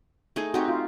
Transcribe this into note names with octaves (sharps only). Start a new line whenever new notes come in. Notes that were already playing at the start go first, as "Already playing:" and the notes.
A3 D#4 G#4
C4 D#4 F#4 G4
F4